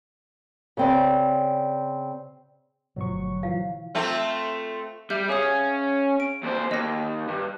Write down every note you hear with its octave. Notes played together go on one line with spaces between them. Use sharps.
C#3 C4 D5
G1 B2 D3 F3 F#3 A3 C#6
E3 F3 F5
A3 C4 F4
G3 E5 G6
C#4 G#4 F5 D#6
D7
D#2 C5
D#2 D#5 A#6
G2